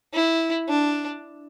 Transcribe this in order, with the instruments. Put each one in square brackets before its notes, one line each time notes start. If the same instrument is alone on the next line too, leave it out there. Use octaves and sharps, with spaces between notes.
[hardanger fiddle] E4
D4